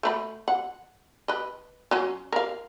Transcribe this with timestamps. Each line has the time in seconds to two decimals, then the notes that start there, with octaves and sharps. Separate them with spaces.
0.03 A3 B4 B5
0.48 F#5
1.28 B4 D#5
1.91 F#3 C#4
2.32 A#4 F5